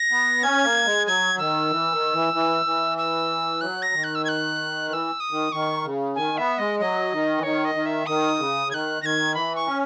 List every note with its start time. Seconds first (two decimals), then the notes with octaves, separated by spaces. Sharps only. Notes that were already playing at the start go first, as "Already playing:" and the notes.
Already playing: A#6
0.11 B3
0.43 C#4 G#6
0.64 A#3
0.85 G#3
1.06 F#3 G#6
1.38 D#3 E6
1.71 E3
1.92 D#3
2.13 E3
2.33 E3
2.65 E3
2.98 E6
3.61 F#3 F#6
3.82 A#6
3.93 D#3
4.04 F#6
4.15 E6
4.25 G#6
4.29 F#6
4.88 E3 E6 F#6
5.20 D#6
5.31 D#3
5.52 D#3 C#6
5.85 C#3
6.16 D#3 G#5
6.37 B3 E5
6.58 G#3 D#5
6.80 F#3 D#5
7.12 D#3
7.38 E3
7.43 D#3 C#5
7.65 D#5
7.75 D#3
7.86 E5
8.06 D#3 D#6
8.39 C#3
8.71 D#3 F#6 G#6
9.02 D#3 G#6 A#6
9.34 E3 B5
9.56 C#6
9.66 C#4